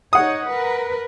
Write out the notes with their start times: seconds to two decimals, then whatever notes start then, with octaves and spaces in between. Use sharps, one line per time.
0.13 D#4 C#5 F#5 D#6
0.49 A#4 B4